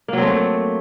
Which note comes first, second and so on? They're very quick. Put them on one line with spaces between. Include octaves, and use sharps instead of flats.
A#3 F#3 C4 A3